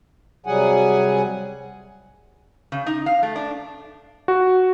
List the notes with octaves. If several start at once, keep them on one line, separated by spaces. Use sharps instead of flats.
C3 F#3 G3 G#4 F#5 G#5
C#3
D#4
F5
A3
D4
F#4